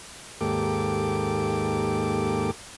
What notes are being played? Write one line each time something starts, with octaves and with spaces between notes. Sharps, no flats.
D#2 G#2 A#3 G4 A4 D6